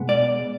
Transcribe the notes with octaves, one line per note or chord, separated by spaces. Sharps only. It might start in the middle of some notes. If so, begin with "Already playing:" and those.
Already playing: B2 G#3 B3
D5